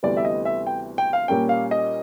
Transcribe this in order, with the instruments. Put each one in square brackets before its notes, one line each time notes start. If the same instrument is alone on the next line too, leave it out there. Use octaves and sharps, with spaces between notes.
[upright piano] D2 C3 E3 G3 B3 D5
E5
D#5
E5
G5
G5
F5
A#2 G3 A#3 C#4 G5
F5
D#5